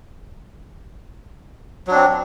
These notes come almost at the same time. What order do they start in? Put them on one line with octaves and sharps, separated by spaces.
F#3 D4 C4